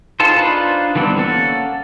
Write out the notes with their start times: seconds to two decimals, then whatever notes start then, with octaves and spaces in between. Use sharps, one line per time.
0.20 D#4 F4 G#4 A4 C5
0.36 D4 D#4 F4 B4 C5
0.95 D3 E3 G3 B3 C4
1.17 A#3 C#4 A4 F#5